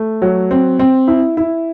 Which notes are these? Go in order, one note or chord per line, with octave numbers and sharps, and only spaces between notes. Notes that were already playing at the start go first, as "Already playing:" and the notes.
Already playing: A3
F#3
C4
C4
E4
E4